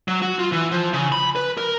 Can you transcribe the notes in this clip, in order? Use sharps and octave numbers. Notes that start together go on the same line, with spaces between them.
F#3
F#4
F4
E3
F3
C#3
B5
B4
A#4